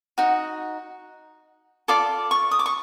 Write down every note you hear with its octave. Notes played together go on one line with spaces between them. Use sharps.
D#4 F#4
F4 A4 D5 D6
C#6
D#6
D6
C#6